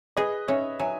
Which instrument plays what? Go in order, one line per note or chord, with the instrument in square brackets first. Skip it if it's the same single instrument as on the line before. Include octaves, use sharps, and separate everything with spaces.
[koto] G#4 [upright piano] B4 D#5
[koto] C#4 [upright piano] C#5 E5
[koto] F#3 [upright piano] E5 G#5